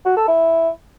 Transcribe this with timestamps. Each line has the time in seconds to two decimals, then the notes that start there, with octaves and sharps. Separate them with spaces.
0.05 F#4
0.17 A4
0.28 E4